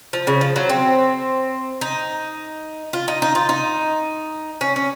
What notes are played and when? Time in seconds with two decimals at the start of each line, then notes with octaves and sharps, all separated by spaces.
0.13 F3
0.27 C#3
0.41 F3
0.56 F#3
0.70 C4
1.81 D#4
2.93 F4
3.08 D#4
3.22 D#4
3.35 F4
3.49 D#4
4.61 C#4
4.76 C#4